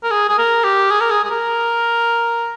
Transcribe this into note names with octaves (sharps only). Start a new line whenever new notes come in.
A#4
G#4
G#4
A#4
G4
G#4
A#4
G#4
G#4
A#4